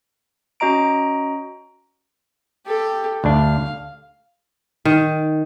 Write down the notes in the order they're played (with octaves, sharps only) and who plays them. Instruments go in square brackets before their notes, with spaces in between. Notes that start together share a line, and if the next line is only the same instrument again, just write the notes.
[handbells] C#4 F#4 D#5 A#5 D7
[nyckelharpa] G4 A4
[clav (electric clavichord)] D2 D4 [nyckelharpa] F5
[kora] D#3